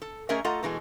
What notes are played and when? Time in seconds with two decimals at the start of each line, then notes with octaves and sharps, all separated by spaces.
0.02 A4
0.29 A3 C#4 G#4 A#4 D#5 E5
0.44 A3 F4 A4 D#5 F#5 A#5
0.63 B2 E3 G#3 A3